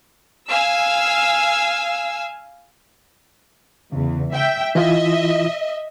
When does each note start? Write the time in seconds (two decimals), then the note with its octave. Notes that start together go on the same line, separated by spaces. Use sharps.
0.49 F5 G#5 E6
3.92 E2 C#3
4.32 E5 G5
4.75 E3 E4 F4 D#5 E5